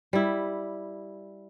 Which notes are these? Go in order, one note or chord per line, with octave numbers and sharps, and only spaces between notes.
G3 E4